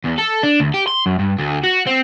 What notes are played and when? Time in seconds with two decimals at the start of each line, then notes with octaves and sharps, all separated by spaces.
0.05 E2
0.19 A4
0.43 D4
0.60 D2
0.74 G4
0.87 C6
1.06 F#2
1.19 G2
1.38 D2
1.63 F#4
1.87 C4